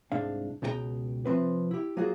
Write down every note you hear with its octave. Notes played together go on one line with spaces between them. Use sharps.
C2 G#2 D4 F5
C#2 B2 D4 F#4 G5 A#5
C3 F3 C4 B4
E4 G4
F#3 A#3 F4 F#4 G#4